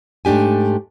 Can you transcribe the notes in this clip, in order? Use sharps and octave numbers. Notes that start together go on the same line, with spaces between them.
G#2 A3 D4 G4 G#5